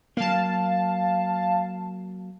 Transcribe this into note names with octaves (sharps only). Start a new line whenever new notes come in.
F#3 A#3 F5 A5